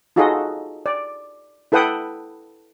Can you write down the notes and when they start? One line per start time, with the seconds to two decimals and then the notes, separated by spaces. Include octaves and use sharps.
0.16 D#4 F4 F#4 G#4 A4 D#5
0.86 D5
1.72 E4 A4 B4 F#5 G5 D#6